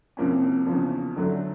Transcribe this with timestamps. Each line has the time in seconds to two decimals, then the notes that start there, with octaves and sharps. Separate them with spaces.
0.17 C2 C3 F3 A#3 C#4
0.67 E2 C#3 F3
1.16 D3 F#3 A3 D4